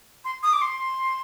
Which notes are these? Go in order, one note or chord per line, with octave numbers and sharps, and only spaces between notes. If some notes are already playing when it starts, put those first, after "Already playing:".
C6
D#6
D6
C6